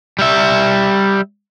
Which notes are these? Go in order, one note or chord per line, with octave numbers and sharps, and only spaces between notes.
G3 E5